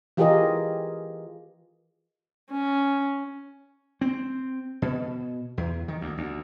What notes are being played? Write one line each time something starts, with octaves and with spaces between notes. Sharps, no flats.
E3 F4 G4 G#4 A#4 D#5
C#4
C4
B2
E2
D#3
D2
D2